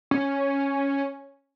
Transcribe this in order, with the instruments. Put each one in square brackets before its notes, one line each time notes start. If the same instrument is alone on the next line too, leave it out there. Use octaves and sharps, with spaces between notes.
[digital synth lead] C#4